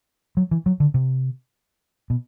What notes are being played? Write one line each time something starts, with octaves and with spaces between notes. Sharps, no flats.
F#3
E3
F#3
D3
C3
B2